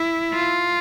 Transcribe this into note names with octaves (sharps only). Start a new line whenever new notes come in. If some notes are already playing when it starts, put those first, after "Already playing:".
Already playing: E4
F4